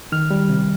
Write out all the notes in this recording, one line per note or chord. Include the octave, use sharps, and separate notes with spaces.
D#3 F6
G3
C3